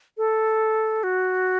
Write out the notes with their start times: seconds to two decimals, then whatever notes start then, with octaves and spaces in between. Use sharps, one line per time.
0.18 A4
1.03 F#4